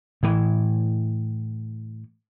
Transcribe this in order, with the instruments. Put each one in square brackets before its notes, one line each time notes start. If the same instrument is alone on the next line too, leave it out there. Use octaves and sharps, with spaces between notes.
[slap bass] A2 E3